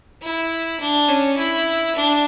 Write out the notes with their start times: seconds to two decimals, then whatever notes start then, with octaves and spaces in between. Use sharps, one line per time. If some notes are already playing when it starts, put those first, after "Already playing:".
0.22 E4
0.80 D4
1.09 C#4
1.38 E4
1.96 D4